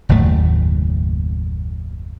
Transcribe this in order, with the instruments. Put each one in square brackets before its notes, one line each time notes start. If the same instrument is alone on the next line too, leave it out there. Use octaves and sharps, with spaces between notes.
[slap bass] F#1 D#2 A2 A3